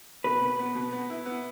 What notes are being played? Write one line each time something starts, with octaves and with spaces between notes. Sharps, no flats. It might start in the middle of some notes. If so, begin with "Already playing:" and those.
B2 B4
B2
B3
B2
B3
E4
B3